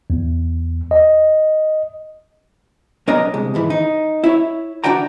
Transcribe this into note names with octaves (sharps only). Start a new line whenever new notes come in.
E2
D#5
B1 D4 A#4 C#5 D#5 A#5
C2 G#3
D#2 G#2 E3
D#4
E4 C#5
D4 D#4 F#4 D5 G5 A#5